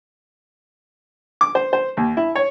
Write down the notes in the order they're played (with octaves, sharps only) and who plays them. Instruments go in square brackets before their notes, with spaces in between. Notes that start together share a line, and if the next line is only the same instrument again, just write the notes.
[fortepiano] D6
C5
C5
D#2
E4
C#5